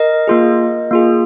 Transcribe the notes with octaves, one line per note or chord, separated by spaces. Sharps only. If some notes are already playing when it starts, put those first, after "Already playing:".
Already playing: A#4 D#5
A#3 F4 G#4
A#3 F4 G#4